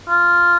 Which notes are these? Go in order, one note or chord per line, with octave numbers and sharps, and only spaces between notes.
F4